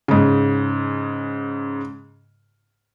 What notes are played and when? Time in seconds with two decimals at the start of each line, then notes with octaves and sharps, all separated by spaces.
0.08 G#2 C#3